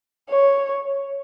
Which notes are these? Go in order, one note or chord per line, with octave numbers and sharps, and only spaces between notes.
C#5